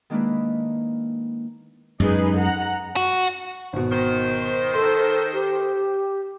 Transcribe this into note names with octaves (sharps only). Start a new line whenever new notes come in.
D#3 G#3 A#3 D4 E4 B4
F#2 G#3 D#4 G#4 B4
F#5 A#5
F#4
G#1 B2
D#3 C5
A4 C6
G4